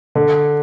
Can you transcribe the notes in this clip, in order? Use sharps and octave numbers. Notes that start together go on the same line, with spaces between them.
D3